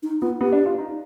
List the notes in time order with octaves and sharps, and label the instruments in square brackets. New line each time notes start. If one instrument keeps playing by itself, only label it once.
[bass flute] D#4
[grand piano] B3 [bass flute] F4
[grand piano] B3 [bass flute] G4
[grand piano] D4
F4
D#4